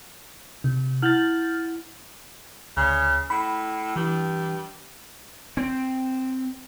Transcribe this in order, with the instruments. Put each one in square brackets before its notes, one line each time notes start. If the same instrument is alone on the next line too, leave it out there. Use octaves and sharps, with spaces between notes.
[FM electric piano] C3
[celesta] E4 F#5 F#7 [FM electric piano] F6 G6 A6
[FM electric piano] D2 [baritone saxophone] C#3
[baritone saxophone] A2 [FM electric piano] B5
[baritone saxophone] G2 [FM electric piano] E3
[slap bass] C4